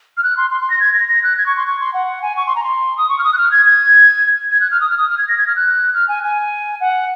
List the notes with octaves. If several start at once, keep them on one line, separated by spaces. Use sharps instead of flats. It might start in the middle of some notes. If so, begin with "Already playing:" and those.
F6
F#6
C6
C6
C6
A#6
G#6
A#6
A#6
F#6
G#6
C#6
C6
C#6
C6
F#5
G#5
C#6
C6
A#5
C6
D#6
C#6
F6
D#6
F#6
F6
G#6
G#6
G#6
F#6
F6
D#6
F6
D#6
F6
G#6
A#6
G#6
F6
F#6
F6
G#5
G#5
F#5